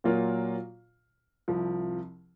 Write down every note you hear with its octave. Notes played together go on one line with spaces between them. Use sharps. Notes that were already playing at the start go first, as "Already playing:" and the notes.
A#2 F#3 A#3 F4
C2 C3 F3